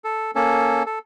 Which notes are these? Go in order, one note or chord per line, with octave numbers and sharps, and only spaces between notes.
A4
A#3 C#4 A4
A4